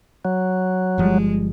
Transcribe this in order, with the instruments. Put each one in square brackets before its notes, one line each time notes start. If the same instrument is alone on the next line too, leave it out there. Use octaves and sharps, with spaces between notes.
[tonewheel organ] F#3
[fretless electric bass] G1 F3 G3 [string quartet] G#3